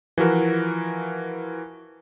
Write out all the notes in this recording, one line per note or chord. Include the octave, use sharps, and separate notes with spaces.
E3 F3 F#4 A#4